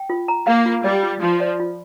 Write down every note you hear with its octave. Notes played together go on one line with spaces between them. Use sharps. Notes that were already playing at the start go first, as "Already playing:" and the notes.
Already playing: G5
F4
A#5
A#3 F5
F4
G3 D5
F4
F3 F4
D5
F4